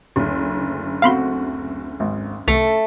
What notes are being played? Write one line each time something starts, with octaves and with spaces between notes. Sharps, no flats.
F#1 D2
A3 C4 F#4 F5 B5 C6
G#1
C2 A3 A4